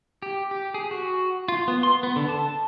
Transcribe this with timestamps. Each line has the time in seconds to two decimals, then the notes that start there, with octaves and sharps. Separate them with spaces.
0.22 G4
0.51 G4
0.74 G#4
0.91 F#4
1.48 F4
1.68 B3
1.83 C6
2.03 B3
2.16 D3
2.29 A5